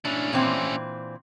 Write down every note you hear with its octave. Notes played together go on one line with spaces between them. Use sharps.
C#4 D4 E4
A#2 E3 C4